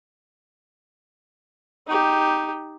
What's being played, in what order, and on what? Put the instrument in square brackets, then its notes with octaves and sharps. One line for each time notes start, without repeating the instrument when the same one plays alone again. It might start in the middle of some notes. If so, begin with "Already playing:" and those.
[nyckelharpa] D#4 G4